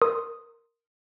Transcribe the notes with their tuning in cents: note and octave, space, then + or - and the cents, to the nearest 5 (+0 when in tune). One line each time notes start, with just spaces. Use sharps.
A#4 -5 C6 +0 D#6 +0